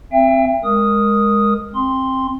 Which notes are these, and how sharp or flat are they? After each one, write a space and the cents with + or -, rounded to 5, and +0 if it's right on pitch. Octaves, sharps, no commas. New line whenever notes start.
C4 +0 E5 +35 G5 +30
G#3 +0 A#4 +0 D#6 +0
C4 +20 C6 +0